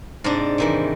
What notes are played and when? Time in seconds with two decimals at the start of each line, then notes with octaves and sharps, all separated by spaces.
0.24 G#2 C3 D4
0.58 C3 D#3 E3